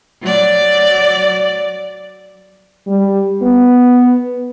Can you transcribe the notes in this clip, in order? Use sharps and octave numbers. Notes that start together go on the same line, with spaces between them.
F#3 D5
G3
B3